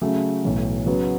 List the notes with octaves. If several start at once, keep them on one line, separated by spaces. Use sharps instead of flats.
C#3 F#3 A3
B1 A2 E3
C#3 F#3 B3